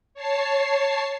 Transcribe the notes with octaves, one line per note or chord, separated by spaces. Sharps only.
C#5 A5 C7